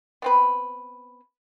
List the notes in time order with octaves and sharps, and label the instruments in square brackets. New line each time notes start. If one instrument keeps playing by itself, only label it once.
[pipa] B3 C4 B4